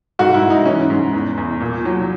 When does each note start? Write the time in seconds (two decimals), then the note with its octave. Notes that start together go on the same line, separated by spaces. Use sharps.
0.19 G#2 F#4
0.34 E4
0.42 G#2
0.50 D#4
0.65 E3 C#4
0.90 G#2
1.13 E2
1.37 E2
1.60 A#2
1.85 F#3